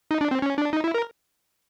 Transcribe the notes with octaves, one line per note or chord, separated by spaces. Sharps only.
D#4
D4
C4
C#4
D4
D#4
E4
A#4